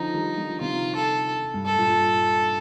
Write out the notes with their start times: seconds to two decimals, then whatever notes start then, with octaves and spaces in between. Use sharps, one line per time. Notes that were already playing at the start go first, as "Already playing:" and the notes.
Already playing: D3 F3 D#4
0.14 D#3 G3
0.37 D3 F3
0.60 C3 D#3 F4
0.96 A4
1.54 G2
1.66 A4
1.77 G2 A#2